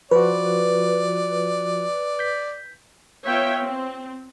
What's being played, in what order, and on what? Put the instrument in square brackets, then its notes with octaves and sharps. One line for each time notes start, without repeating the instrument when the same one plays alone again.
[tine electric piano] F3 F4 F#4 [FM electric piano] B4 [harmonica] D5
[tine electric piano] G6 B6
[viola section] B3 F4 C#5 E5 G5
C4